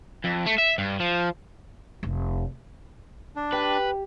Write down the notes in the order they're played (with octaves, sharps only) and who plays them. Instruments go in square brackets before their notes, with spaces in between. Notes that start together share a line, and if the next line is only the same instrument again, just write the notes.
[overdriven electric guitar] F2
A3
E5
G2
F3
[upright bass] F1
[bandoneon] D4
[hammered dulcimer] G4 [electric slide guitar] B4